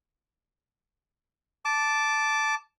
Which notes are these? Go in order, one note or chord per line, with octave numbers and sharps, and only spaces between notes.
A5 D6